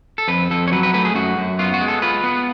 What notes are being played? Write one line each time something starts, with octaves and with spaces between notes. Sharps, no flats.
A4
F2 B4
F2 A4
C#5
F#3 B4
B4
A3 B4
G#4
F#2 F#4
F#2
B3 F4
F#4
G#3
A4
F4 B4
B3